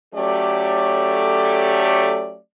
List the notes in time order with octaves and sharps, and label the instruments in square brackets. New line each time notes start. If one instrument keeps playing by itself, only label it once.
[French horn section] F#3 A3 C#4 G4 A4 D5